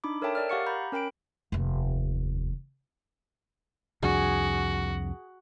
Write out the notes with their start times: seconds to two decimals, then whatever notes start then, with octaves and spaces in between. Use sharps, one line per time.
0.04 D4 D#4 B5 D6
0.22 A4 A#4 C#5 E5 G5 A5
0.35 A#4 D5 F6
0.49 G4 F5 F#5 C#6 A6 C#7
0.66 A#5 B5 G6
0.92 C#4 A#4 G5 B5 D7
1.52 F1 D#2
4.03 C2 F2 D4 F#4 G#4